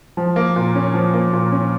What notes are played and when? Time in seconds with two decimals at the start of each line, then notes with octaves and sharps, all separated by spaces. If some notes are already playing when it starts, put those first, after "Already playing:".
0.17 F3
0.36 A#3
0.56 A#2
0.75 C#4
0.94 F3
1.14 A#3
1.33 A#2
1.52 C#4